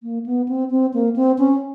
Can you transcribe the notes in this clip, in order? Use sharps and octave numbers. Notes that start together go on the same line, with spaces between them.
A#3
B3
C4
C4
A#3
C4
C#4